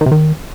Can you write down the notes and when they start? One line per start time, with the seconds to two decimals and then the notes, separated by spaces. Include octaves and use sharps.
0.01 D#3
0.06 C3
0.11 D#3